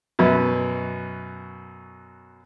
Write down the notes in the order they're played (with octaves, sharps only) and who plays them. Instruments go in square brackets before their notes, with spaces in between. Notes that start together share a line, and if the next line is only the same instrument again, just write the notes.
[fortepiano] F#2 B2